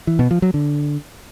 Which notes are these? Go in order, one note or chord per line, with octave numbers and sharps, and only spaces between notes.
E3
B2
F3
F#3
D3